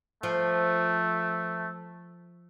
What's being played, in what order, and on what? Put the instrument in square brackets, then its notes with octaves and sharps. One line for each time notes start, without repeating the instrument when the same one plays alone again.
[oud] F3 [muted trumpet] A3